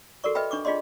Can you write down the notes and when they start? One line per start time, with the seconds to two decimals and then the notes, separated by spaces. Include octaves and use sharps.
0.24 F#4 A4 A#4 D5 C#6
0.35 B4 D#5 E5 G5 B5
0.51 D4 C#6 D6
0.65 D4 F4 G#4 D5 D#5 C6